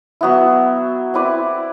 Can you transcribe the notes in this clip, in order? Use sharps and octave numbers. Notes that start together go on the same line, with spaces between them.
F#3 B3 E4
C4 E4 B4 D5